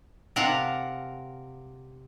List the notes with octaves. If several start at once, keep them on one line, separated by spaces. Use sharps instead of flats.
C3 A#4 F5 F#5 A5